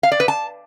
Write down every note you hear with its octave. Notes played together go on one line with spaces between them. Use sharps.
F5
D5
B4
A5